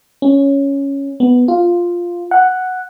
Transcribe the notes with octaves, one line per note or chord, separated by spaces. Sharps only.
C#4
B3
F4
F#5